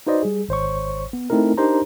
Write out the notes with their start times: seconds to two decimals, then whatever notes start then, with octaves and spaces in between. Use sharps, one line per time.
0.07 D#4 F#4 B4 C5 D5 D#5
0.23 G3 G#4
0.49 G#1 C5 C#5 C#6
1.13 B3
1.30 A3 C4 D#4 E4 A#4
1.57 D4 D#4 G4 A#4 C5 A#5